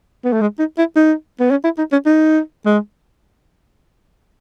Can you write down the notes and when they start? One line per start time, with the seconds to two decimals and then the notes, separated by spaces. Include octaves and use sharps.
0.25 B3
0.33 A3
0.41 G#3
0.59 D#4
0.78 E4
0.96 D#4
1.40 B3
1.51 C#4
1.64 E4
1.78 D#4
1.92 C#4
2.06 D#4
2.66 G#3